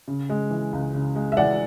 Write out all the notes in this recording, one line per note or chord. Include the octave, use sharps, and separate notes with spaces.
C#3
G#3
E3
C#2
C#3
G#3
E5
E3 D5 F#5